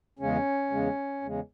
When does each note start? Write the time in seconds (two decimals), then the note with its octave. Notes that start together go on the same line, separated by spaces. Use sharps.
0.19 E2 C#3 G#3 C#4
0.70 E2 C#3 G#3
1.22 E2 C#3 G#3